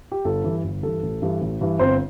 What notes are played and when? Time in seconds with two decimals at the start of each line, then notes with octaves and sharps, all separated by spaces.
0.12 G4
0.25 G1 A4
0.44 G2 E3
0.64 G1
0.83 G2 E3 A4
1.03 A1
1.22 G2 E3
1.41 A1
1.61 G2 E3
1.79 G1 C4 C5